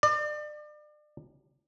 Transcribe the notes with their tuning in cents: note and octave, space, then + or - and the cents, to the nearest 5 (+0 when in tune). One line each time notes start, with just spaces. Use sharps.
D5 +35